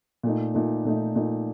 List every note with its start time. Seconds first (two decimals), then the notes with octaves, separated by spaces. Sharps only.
0.23 A#2 A3 D#4
0.54 A#2 A3 D#4
0.85 A#2 A3 D#4
1.15 A#2 A3 D#4